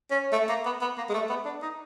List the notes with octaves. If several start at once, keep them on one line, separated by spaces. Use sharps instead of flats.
C#4
A3
A#3
B3
B3
A#3
G#3
A3
B3
D4
D#4